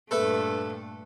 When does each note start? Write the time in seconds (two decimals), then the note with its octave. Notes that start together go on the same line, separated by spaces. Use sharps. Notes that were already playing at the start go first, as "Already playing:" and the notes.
0.11 G2 A#2 A3 A4 B4 E5